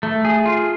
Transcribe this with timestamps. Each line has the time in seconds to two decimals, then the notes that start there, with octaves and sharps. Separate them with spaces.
0.03 A3
0.25 G#4
0.46 F4